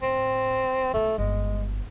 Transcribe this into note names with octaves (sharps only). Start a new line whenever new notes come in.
A2 C4
B1 A3 F4
G1 G#3